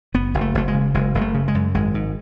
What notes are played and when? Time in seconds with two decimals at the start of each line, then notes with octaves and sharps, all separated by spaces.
0.14 F#1 B3
0.34 F#1
0.41 A3
0.55 F#1 A3
0.68 G#3
0.74 C#3
0.94 F#1 G#3
1.15 F#1 G#3
1.21 A3
1.34 C#3
1.48 G#3
1.54 F#2
1.74 G#1 G#3
1.94 G#2